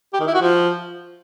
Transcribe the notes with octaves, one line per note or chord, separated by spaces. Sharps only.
G4
D#3
E4
F#4
F3